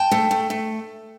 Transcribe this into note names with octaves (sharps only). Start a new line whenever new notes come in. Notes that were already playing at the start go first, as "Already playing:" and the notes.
Already playing: G5 A5
A3
A3
A3